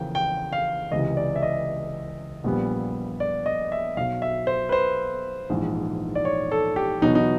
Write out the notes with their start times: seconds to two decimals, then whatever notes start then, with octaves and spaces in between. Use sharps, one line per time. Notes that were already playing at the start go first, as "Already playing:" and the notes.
Already playing: E2 C#3 F3 A#3 G5
0.15 G5
0.53 F5
0.91 C#2 C3 E3 D#5
1.17 D5
1.36 E5
1.42 D#5
2.44 A#1 A#2 G3 B3
3.20 D5
3.46 D#5
3.72 E5
3.96 B1 B2 F#3 F5
4.22 E5
4.47 C5
4.69 B4
4.72 C5
5.50 A#1 G#2 E3
6.15 D5
6.25 C#5
6.52 A4
6.76 G4
7.02 E2 B2 F#3 B3 D#4
7.15 D#4